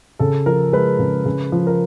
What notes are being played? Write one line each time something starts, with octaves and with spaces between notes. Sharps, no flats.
C#3 A4
F3 A#4
G#3 B4
C#3
C#3
F3
A#4